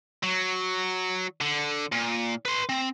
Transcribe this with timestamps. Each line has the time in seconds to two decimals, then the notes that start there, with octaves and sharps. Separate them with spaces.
0.23 F#3
1.41 D3
1.92 A#2
2.45 B4 C6
2.69 C4